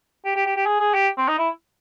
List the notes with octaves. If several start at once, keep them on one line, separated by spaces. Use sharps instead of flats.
G4
G4
G4
G4
G#4
G#4
G4
C4
D#4
E4